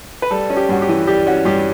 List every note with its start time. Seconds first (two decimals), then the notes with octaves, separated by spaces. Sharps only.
0.22 B4
0.31 G3 A4
0.50 C#4
0.57 G4
0.69 G2 F#4
0.82 G4
0.89 E3
1.07 G3 G4
1.27 C#4 F#4
1.45 G2 G4